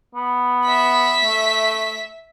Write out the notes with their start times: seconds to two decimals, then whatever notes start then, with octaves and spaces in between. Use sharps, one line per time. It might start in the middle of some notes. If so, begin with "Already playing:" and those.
0.15 B3
0.65 E5 B6
1.24 A3